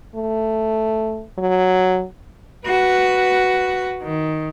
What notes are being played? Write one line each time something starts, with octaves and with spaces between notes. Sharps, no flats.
A3
F#3
F#4 B4
D#3